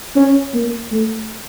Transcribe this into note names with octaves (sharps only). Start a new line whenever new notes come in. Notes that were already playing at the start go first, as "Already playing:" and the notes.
C#4
A#3
A3